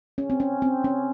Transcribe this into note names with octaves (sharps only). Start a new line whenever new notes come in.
C#4
C4
C#4
C4
C#4